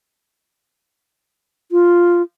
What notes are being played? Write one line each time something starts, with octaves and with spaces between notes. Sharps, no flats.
F4